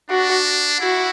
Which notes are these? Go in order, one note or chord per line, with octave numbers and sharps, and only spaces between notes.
D4 F#4
E4 F#4